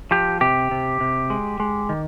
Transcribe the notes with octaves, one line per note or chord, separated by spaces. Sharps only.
F3 G4
C3 G4
C3
C3
G#3
G#3
D#3